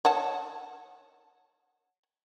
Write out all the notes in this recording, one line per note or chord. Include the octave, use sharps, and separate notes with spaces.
C#5 F#5 A5